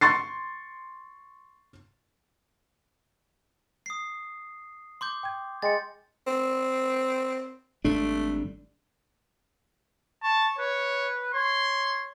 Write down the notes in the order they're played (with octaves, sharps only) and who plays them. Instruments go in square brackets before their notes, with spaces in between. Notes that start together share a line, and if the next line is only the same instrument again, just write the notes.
[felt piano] C6 C#6 A6 C7
[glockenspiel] D#6 C7
C6 D6 G6
[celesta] G5 G#6
[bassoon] G#3 [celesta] G5 C6 C#7 [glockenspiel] A6
[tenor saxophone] C4
[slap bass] G#1 G3 D4 [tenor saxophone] A3
[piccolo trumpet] A5 [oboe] C#6
[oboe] B4 [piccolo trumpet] C#5
[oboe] C#5 [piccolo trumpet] C6